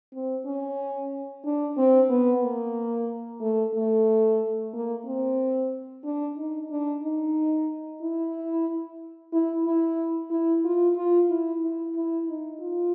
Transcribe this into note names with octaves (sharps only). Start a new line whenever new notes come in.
C4
C#4
D4
C4
B3
A#3
A3
A3
A#3
C4
D4
D#4
D4
D#4
E4
E4
E4
E4
F4
F4
E4
E4
E4
D#4
F4